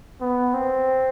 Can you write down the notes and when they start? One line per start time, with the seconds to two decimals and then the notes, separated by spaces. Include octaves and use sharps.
0.21 B3
0.54 C4